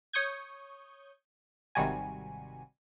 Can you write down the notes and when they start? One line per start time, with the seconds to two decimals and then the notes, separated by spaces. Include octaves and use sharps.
0.13 C#5 C#6 D#6 G6 G#6
1.75 G#1 C3 D#3 G3 F#4 G#5